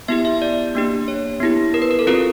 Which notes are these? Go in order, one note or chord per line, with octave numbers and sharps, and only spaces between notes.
B3 E4 G4 E5
E5
D5
A#3 D4 G4
C#5
B3 E4 G4
A#4
B4
A#4
A4
C4 F4 G#4 A#4